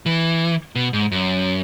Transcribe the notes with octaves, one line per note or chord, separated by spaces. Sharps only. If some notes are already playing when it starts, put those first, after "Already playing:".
E3
B2
G#2
F#2